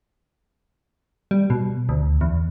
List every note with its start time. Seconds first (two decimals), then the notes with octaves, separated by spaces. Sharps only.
1.31 G3
1.50 B2
1.89 D2
2.21 E2